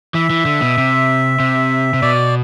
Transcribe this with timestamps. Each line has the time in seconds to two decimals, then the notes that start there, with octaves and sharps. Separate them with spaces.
0.14 E3 E5
0.30 E3
0.45 D3
0.61 B2
0.78 C3
1.40 C3
1.94 C3
2.02 B2 D5